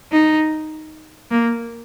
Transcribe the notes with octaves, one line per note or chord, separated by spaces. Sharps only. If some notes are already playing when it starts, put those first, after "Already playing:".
D#4
A#3